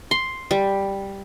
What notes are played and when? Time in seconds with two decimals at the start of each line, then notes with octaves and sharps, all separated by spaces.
0.11 C6
0.51 G3